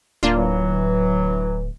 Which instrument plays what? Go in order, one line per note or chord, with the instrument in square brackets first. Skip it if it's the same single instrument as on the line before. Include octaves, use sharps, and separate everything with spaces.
[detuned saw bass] D1 [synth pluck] A#3 D4 F4
[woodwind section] E3 F#3